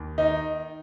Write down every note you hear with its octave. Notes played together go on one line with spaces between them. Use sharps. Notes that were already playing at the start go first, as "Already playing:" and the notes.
Already playing: D#2
D#3 D#4